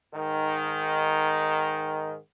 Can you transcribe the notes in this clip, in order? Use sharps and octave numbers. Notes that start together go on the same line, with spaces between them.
G#2 D#3